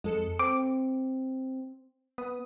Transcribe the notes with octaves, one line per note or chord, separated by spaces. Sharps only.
F2 G#3 A4 C#7
C4 D6
B3 D#6